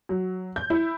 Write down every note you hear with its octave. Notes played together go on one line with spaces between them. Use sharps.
F#3
G6
E4